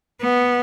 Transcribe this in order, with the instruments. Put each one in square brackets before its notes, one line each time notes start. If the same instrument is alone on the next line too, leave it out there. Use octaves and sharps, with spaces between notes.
[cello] B3